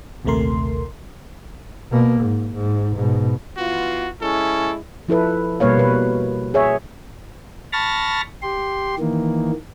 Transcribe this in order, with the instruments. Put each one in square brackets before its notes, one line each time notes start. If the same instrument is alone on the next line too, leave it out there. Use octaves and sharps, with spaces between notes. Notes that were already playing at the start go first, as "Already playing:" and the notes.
[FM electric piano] A#1 D#2 C3 A3 A#4 C6
[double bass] B2 A#3
G#2
G#2
G#2 B2
[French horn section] E3 B3 F4 [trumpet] F#4
[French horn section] G#3 E4 [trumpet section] C#4 [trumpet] A4
[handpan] F3 E4 A4 B4
B2 G3 A#3 B4 C#5 F5
B2 B4
G#4 C#5 E5
[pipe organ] A5 B5 C#6 F6 A6 A#6
G4 C6
D#3 E3 A#3